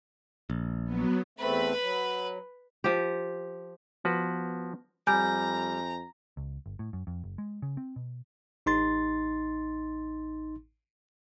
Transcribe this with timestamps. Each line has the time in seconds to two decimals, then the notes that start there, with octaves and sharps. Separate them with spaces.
0.50 A#1
0.84 F#3 B3
1.39 E2 A3 C4 B4 B5
1.81 F#3
2.84 F3 G4
4.05 F3 B3 F#4 B4
5.07 F2 G3 G#5 A#5 G6
6.37 C#2
6.66 G1
6.79 A2
6.93 F#2
7.07 F2
7.24 F#1
7.38 G#3
7.62 C#3
7.77 C4
7.96 B2
8.66 A1 D#4 C6 A6